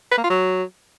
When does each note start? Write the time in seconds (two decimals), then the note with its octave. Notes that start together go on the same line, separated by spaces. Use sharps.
0.12 B4
0.18 A#3
0.24 F4
0.30 F#3